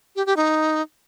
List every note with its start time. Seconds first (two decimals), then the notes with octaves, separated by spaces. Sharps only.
0.16 G4
0.26 G4
0.36 D#4